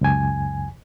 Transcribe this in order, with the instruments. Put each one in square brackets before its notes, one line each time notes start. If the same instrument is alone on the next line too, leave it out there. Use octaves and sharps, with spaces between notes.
[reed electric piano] C#2 F#2 G#5